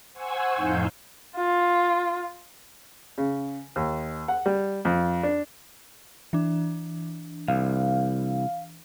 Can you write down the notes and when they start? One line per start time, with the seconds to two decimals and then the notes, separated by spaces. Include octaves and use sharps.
0.13 C5 F#5 G#5 C#6 E6 G#6
0.56 F2 A2 D#4 F5 G6
1.36 F4
3.18 C#3
3.76 D#2
4.28 F#5
4.46 G3
4.85 F2
5.23 D4
6.33 E3 D4
7.48 C2 F5